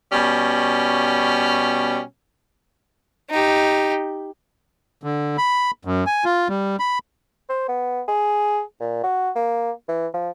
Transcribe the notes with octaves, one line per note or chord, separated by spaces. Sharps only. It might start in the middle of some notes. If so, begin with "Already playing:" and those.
B2 G3 C#4
D#4 G4
D3
B5
F#2
G#5
F4
G3
B5
C5
B3
G#4
A#2
F#4
A#3
E3
F3